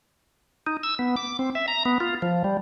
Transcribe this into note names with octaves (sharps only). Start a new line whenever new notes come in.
D#4
E6
B3
D6
C4
E5
A#5
B3
F4
F3
G3